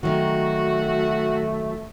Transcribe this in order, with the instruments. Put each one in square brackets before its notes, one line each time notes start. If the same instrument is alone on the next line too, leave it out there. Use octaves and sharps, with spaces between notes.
[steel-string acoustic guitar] D#3 F#3 [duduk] A3 [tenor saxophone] F#4